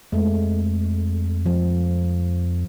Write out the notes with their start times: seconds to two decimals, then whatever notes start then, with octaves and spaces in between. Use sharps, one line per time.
0.12 F2 G#3 A3
1.46 F3